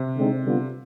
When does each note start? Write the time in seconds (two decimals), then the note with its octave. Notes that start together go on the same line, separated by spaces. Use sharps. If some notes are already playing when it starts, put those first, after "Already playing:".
Already playing: C3
0.17 D3 G#3 C4 D#4
0.45 D3 G3 B3 F4